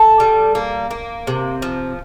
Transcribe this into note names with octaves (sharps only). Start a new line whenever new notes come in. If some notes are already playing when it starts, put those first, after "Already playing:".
Already playing: A4
G3
A#3
A#3
C3
F3